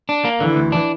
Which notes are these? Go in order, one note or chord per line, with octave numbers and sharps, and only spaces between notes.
D4
A#3
D3 E3
D2
D4